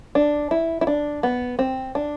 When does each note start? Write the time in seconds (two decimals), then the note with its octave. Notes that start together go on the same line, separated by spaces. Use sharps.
0.15 D4
0.51 E4
0.81 E4
0.87 D4
1.23 B3
1.59 C4
1.95 D4